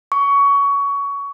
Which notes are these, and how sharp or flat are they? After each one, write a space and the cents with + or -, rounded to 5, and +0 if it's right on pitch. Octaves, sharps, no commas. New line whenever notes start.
C#6 +20